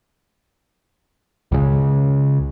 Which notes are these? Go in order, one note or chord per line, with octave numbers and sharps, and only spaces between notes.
C#2 C#3